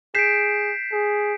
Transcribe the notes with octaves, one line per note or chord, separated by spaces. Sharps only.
G#4 G6 B6 C7 D7 E7
G#4